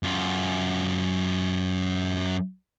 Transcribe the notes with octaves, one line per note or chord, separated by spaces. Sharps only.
F#2 F4